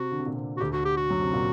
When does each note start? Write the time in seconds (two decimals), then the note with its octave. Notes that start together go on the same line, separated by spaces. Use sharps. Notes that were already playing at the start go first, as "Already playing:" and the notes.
Already playing: C3 F#4
0.12 D3
0.19 C3
0.26 A#2
0.33 C3
0.57 F#4
0.60 D2 D3 G4
0.73 F#4
0.85 G4
0.97 F#4
1.10 F#2 F#3
1.21 C3
1.34 A#2